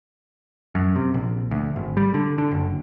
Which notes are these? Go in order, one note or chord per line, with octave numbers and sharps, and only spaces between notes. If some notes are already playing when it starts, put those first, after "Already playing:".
F#2
C3
A#1
D2
G#1
G3
D3
D3
F#1